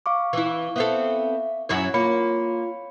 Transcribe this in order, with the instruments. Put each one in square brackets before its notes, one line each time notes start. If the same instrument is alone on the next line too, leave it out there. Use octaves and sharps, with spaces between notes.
[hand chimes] F5 C#6 D6
[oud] E3 E4
[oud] B3 C4 A4 [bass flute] E5
[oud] F#2 E4 C#5
[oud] A#3 [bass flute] F4 [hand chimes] C#5 B5 C#7